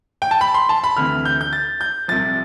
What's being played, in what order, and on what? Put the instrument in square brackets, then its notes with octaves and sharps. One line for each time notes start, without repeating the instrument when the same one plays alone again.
[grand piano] G5
A5
B5
C6
A5
B5
D2 C3 E3 F6
G6
G6
A6
G6
C2 C3 F3 A6